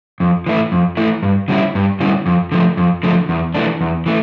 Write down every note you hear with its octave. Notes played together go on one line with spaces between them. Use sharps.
F2
E3 A3 E4
F2
E3 A3 E4
G2
D3 G3 C#4 E4
G2
D3 G3 C#4 E4
F2
D3 F3 A3
F2
D3 F3 A3
E2
E3 A3 D4
E2
E3 A3